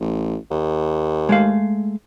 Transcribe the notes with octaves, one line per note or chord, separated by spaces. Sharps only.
A1
D#2
G#3 A3 F5